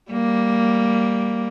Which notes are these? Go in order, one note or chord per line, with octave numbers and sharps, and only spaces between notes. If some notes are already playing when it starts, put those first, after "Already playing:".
G3 A#3